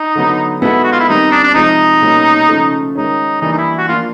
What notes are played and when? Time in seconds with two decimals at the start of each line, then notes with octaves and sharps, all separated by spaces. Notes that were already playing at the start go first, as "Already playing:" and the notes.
Already playing: D#4
0.15 D3 F#3 B3
0.61 G#3 B3 D#4 E4 F#4 A4
0.84 F#4
0.92 F4
1.00 E4
1.08 D#3 G3 C4 D#4
1.32 D4
1.44 D4
1.55 C3 F3 G#3 D#4
2.02 B2 G3 A#3 C#4
2.48 C#3 F3 A3
2.95 D#3 G#3 C#4 D#4
3.41 E3 G3 A#3 D4 D#4
3.52 D#4
3.58 E4
3.78 F#4
3.88 F3 A#3 D4 F4